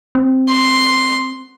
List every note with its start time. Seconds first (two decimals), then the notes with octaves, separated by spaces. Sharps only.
0.15 C4
0.49 C6